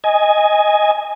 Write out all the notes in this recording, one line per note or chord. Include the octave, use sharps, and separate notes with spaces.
D#5 G#5